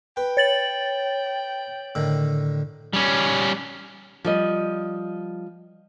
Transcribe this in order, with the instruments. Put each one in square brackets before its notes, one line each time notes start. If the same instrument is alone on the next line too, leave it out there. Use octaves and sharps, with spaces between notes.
[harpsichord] B4 [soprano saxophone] G5
[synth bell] C#5 A6 F#7
[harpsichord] A2 D3 D#3
[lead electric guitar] G3 C#4
[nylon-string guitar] F3 G3 D#5